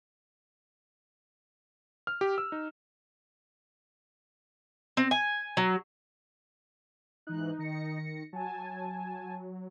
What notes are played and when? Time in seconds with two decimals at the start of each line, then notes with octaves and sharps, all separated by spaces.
2.07 F6
2.21 G4
2.38 E6
2.52 D#4
4.97 C4
5.11 G#5
5.57 F#3
7.27 G#2 E3 D#4 F#6
7.59 D#3 A#6 C#7
8.33 F#3 G#5 A5